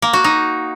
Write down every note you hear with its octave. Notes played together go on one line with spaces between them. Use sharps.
A#3
F#4
D#4